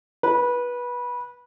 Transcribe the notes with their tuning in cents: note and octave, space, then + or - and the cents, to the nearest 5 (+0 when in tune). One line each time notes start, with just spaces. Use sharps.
B4 -20